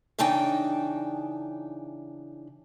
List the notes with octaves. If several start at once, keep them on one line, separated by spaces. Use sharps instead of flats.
C#3 E3 D4 D#4 G5 A5